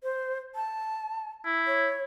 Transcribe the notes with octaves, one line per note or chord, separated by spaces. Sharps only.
C5
A5
E4
C#5